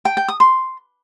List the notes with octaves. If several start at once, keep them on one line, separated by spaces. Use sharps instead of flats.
G5
G5
D#6
C6